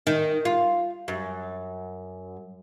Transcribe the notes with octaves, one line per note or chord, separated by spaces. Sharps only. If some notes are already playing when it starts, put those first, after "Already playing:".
D#3
F4
F#2